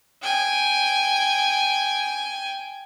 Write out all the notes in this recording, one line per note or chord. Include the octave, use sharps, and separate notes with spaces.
G5 G#5